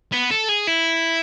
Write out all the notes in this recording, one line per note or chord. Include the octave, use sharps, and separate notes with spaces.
B3
A4
G#4
E4